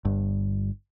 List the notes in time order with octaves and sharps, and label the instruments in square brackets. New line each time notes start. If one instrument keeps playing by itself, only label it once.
[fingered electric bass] G1 G2